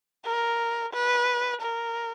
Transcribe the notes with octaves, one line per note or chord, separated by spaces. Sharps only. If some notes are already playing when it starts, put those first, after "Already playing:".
A#4
B4
A#4